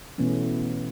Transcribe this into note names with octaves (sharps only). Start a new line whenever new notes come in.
B2 E3 A3 B3 C#4